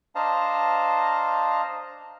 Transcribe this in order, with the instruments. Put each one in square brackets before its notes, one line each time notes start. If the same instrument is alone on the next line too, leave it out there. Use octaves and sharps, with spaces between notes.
[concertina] D4 C5 D#5 F5 A5 A#5